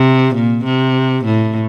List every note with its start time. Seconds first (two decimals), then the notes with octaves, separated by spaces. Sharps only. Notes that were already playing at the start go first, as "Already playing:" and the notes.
Already playing: C3
0.35 A#2
0.65 C3
1.25 A2